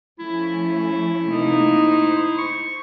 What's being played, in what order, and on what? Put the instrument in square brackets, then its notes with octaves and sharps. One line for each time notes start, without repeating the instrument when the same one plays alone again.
[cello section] F3 A3 C#4 [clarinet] E4
[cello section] C3 A3 A#3 [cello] D#4
[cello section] C5
[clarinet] C#6